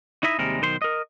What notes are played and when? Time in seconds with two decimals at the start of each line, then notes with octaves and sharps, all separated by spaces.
0.23 D#4 E4 D#5 E5
0.39 D#2 C3 G3 G#3 A#4
0.62 B1 D#3 C5 C6
0.82 A#4 D#5